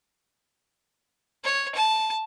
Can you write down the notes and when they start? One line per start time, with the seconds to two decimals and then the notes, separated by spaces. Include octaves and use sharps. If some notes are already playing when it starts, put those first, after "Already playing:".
1.44 C#5
1.75 A5